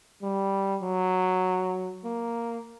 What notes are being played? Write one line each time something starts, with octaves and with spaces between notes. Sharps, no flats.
G3
F#3
A#3